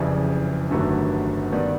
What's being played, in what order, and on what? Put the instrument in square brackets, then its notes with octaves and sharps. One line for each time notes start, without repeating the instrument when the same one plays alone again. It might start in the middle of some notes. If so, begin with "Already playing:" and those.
Already playing: [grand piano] F#1 F2 C#3 E3 G3
G1 G2 D#3 F#3 A3
G2 D#3 G3 B3